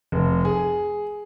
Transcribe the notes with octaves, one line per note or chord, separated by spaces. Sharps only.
F1
G#4